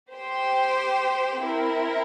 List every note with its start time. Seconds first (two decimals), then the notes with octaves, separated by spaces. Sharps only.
0.14 G4 C5 G5
1.41 C4 E4 A#4